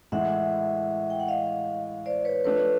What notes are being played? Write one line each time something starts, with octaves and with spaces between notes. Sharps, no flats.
A2 E3 G#3 E5 F#5
G5
F#5
D#5 F5
C5 D5
B4 C#5
F3 A3 D4 B4 C#5